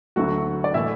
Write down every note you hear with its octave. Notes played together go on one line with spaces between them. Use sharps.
D2 D3 F#3 A3 F#4 F#5
D5
A2 E3 A3 E4 E5